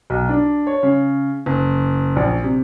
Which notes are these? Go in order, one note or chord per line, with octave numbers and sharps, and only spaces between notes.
B1
D4
C#5
C#3
F#1
A#1
C3